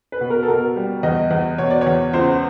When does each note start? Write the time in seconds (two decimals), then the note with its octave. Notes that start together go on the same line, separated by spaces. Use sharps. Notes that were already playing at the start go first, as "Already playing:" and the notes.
0.12 B4
0.21 B2
0.30 A#4
0.43 A4
0.48 B2 A#4
0.76 G3
1.03 E2 D#5
1.31 E2
1.58 B2 C#5
1.70 D5
1.81 C#5
1.87 E2
2.13 C#2 C5